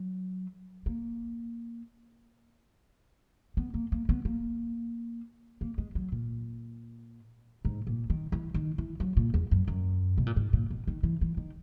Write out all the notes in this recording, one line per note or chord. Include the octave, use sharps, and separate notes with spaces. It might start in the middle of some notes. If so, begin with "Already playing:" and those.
Already playing: F#3
A#3
B3
A#3
A#3
B3
A#3
A#3
G#3
F#3
A#2
G#2
A#2
D#3
E3
D#3
E3
F#3
A#2
E2
F#2
F#2
B2
A#2
G#2
A#2
B2
D#3
E3
E3
D#3